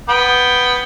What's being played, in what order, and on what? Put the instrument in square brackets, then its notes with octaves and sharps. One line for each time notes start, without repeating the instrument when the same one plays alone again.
[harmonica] B3 G5